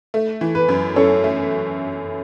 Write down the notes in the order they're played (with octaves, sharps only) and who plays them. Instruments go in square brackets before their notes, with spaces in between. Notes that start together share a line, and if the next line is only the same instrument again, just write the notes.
[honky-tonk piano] A3
E3
[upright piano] B4
[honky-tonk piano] F#2
[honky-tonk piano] F#2 [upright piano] A4 C#5
[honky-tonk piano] A3